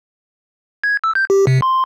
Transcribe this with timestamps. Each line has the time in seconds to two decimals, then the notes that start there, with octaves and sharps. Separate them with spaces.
0.84 G#6
1.04 E6
1.15 G6
1.30 G4
1.47 C3
1.62 C6